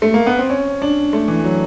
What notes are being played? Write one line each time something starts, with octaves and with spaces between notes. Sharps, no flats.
A3
A#3
B3
C4
C#4
D4
A3
E3
F#3